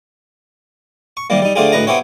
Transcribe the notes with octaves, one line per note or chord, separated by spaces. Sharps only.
C#6
C3 D#3 G3 A#3
G3 D#4
D3 A3 C4 F4 G4 G#4
D2 A2 B4 D#5 A#5
B3 C4 E4 G4 C#5